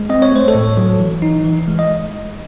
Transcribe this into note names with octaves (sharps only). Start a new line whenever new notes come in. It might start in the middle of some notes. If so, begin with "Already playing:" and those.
Already playing: G#3
C4 D#5
C#5
A3 C5
A4 C#5
A2
F#3
E3
D#4
E3
G#3
D#5